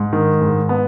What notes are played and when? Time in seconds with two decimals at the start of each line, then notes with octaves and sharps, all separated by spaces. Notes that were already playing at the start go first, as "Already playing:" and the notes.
Already playing: G#2
0.13 D#3
0.41 G#2
0.69 B3